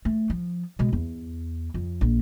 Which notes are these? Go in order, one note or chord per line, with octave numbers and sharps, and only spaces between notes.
A3
F3
B2 G#3
E2
F2
A#1